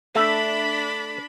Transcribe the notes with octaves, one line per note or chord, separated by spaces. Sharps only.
A3 D4 A4 B5